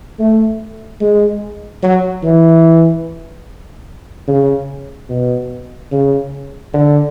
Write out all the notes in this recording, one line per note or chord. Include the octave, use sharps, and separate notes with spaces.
A3
G#3
F#3
E3
C#3
B2
C#3
D3